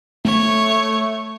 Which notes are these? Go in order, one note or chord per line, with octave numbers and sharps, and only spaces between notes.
A3 C#5